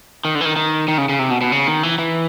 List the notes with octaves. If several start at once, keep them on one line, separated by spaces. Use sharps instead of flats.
D#3
D3
E3
D#3
D#3
D#3
C#3
C#3
C3
B2
B2
C#3
D#3
E3
E3